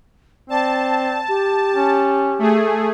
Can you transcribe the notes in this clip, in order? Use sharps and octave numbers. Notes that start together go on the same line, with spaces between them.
C4 D5 A5
G4
C#4
A3 G#4